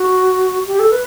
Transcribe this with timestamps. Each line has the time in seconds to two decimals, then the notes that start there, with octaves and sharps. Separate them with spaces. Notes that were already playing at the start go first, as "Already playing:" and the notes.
Already playing: F#4
0.67 G4
0.79 A4
0.92 B4